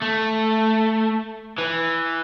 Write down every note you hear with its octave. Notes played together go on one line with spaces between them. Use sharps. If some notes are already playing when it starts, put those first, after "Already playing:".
A3
E3